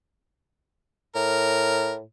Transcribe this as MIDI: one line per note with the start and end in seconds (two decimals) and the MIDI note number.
1.15 2.03 45
1.15 1.92 70